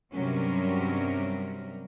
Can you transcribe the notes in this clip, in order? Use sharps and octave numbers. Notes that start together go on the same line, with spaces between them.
G2 C3 F#3 G3 C#4 A#4